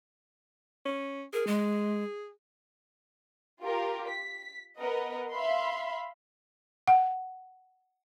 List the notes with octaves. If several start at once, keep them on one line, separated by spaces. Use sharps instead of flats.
C#4
G#4 A#4
G#3
F4 G4 A#4
B6
B3 A#4 B4 D#5 F#5
E5 F5 B5 C6
F#5